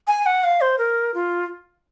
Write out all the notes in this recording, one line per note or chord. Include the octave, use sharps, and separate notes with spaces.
G#5
F#5
F5
C5
A#4
F4